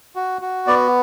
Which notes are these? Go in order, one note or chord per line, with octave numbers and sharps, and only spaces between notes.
F#4
F#4
B3 D5